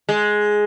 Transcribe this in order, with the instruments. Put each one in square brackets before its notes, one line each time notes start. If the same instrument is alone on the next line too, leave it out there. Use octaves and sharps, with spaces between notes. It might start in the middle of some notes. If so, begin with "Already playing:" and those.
[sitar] G#3